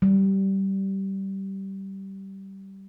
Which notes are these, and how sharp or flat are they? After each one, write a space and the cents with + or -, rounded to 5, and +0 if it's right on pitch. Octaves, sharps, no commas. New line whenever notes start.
G3 -20